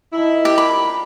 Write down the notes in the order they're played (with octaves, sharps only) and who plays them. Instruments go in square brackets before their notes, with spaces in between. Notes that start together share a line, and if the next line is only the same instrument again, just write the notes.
[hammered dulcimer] D#3 F3 D#5 [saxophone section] E4
[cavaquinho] G4
[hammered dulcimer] D4 [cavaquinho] B5
[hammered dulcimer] A#4 F5